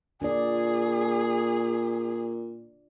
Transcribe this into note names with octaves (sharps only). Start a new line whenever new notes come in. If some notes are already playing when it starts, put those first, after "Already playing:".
A#2 D4 F4 G#4 D5